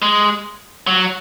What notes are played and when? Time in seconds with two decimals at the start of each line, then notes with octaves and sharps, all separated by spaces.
0.02 G#3
0.87 F#3